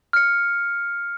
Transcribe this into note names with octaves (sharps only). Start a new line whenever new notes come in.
F6 C#7